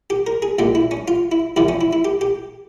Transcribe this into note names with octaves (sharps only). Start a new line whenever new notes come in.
G4
A#4
G#4
C2 A#2 G#3 G4
E4
C#4
F4
E4
C2 C3 F3 E4
C#4
E4
E4
G4
G4